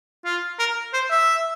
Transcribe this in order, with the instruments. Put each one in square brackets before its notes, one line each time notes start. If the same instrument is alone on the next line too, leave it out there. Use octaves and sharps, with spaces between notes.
[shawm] F4
A#4
C5
E5